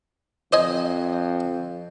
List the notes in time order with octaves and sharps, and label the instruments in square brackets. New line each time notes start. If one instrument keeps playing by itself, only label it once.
[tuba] F2 [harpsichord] C5 D#5 G#5